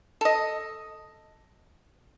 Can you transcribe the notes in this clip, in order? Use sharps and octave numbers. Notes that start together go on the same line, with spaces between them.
A4 D#5